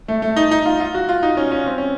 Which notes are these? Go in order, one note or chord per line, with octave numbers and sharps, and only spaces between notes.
A3
A3
D#4
D#4
F4
F4
F#4
F4
D#4
C#4
C#4
C4
C#4